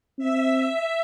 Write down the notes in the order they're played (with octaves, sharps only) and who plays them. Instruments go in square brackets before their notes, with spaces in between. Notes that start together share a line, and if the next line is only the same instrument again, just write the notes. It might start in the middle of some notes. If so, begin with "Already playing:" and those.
[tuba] C4 [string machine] E5